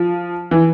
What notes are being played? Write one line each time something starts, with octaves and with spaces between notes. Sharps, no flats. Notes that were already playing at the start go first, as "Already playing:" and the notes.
Already playing: F3
E3